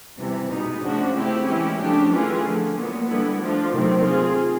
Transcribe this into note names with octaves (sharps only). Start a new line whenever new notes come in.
C3 E3 G3
B2 G#3 B3 D#4
C#3 F3 A3 D4 F#4
A3 C4 E4 G4
E3 G#3 C#4 E4 G4
C#3 F3 A3 D4 G4
E3 A3 C#4 F4 G#4
D3 F3 A3
A#2 F#3 B3
D3 G3 B3 E4
F3 A3 D4 F4
C3 D#3 F#3 A3 C4
C4 F4 G#4